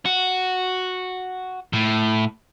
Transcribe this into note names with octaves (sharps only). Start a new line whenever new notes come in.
F#4
A2